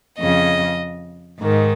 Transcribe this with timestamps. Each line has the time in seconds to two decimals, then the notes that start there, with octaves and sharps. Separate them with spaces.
0.19 F2 C#3 D#5
1.41 G#2 D#3